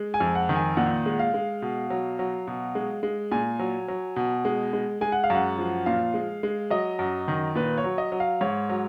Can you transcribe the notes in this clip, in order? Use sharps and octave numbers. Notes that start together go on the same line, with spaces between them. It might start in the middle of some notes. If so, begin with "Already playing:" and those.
Already playing: G#3
G#5
F2
F#5
D#3
G#5
A#2 F#5
G#3
F5
G#3
B2
F#3
F#3
B2
G#3
G#3
A#2 G#5
F#3
F#3
B2
G#3
G#3
G#3 G#5
F#5
F5
F#2 F#5
F3
A#2 F5
G#3
G#3
F#3 D#5
F#2
D#3
A#2 B4
C#5
F#3
D#5
F#3
F5
G#2 C#5
F#3